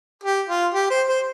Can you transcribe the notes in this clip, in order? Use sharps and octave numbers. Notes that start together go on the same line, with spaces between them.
G4
F4
G4
C5
C5